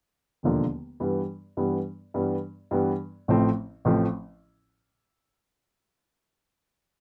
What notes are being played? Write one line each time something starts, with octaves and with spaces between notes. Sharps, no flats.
E1 D#2 D3 F3 A#3
G2 E3 G3 B3
G2 E3 G3 B3
G2 E3 G3 B3
G2 E3 G3 B3
A1 A2 F3 A3 C4
A1 A2 F3 A3 C4